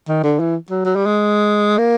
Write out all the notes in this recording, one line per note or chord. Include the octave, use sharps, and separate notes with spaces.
D#3
D3
E3
F#3
F#3
G3
G#3
A#3